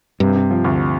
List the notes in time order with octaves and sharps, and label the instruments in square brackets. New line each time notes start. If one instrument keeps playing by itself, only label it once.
[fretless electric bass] G2 [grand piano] C3
[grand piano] C3
F3
D2